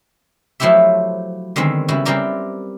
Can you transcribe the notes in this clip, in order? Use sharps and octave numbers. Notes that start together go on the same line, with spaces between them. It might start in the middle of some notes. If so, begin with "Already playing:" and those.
F3 F#3 A3 E4 G4 E5
D3 D#3 G#3 B3 C4
C#3 G3 E4 F#4
G3 C4 E4 G4 A#4 D5